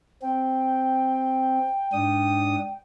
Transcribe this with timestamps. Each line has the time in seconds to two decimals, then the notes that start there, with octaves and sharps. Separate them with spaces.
0.22 C4 G5
1.93 G#2 D4 D#6